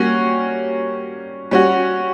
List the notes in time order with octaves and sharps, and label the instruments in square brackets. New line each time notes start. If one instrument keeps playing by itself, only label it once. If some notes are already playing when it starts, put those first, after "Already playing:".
Already playing: [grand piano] G3 A#3 C#4 F#4
G3 C#4 F#4